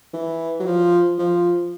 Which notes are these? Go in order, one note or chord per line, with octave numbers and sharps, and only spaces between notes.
E3
F#3
F3
F3